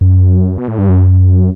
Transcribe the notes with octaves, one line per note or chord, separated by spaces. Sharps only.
F#2
B2
A2
G2
F#2